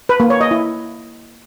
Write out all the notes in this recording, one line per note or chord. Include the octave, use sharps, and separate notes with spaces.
B4
A#3
C#5
D#5
E4